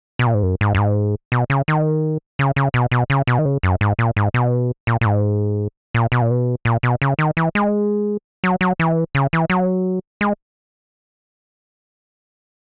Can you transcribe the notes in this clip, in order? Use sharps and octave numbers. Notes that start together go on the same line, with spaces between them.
B2
A#2
G#2
F#2
G#2
F#2
G#2
B2
C#3
D#3
C#3
C#3
B2
B2
C#3
B2
D#3
C#3
F#2
G#2
A#2
G#2
B2
A#2
A#2
G#2
A#2
B2
A#2
B2
A#2
B2
C#3
D#3
E3
G#3
F#3
F#3
E3
C#3
E3
F#3
G#3